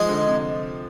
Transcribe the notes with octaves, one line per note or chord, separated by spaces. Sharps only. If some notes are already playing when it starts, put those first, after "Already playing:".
Already playing: F3 G#3 D#4 G#4
D3
C3